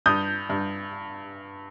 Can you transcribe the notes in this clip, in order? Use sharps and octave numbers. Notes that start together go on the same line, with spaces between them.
G2 D#6 G6
G2